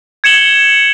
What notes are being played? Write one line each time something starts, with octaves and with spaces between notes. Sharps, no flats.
G#6 C#7 E7 F#7 G7